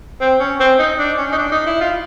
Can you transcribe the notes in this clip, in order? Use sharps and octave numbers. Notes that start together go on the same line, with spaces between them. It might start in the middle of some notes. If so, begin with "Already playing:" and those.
C4
C#4
C4
D#4
D4
C#4
D#4
D4
D#4
E4
F4